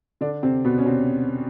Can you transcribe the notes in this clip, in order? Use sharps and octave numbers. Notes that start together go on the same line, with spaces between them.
D3 D4
C3 C4
B2 B3
C#4
C3 C4